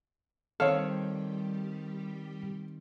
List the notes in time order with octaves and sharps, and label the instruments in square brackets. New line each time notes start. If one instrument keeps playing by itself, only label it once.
[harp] D#3 C4 [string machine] G3 G4 [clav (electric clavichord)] A4 [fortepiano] C#5 F5